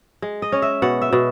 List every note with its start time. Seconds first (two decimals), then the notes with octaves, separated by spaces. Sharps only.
0.22 G#3
0.42 D#5
0.52 C#4
0.62 E5
0.82 B2 F#5
1.01 E5
1.13 B2